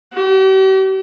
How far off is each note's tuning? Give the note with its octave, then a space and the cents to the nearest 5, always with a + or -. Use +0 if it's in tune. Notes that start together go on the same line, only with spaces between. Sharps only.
G4 -45